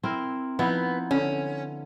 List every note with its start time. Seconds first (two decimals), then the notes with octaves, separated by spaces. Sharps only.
0.04 C4 E4 A#4
0.59 F3 B3 D#4 E4
1.11 D3 C#4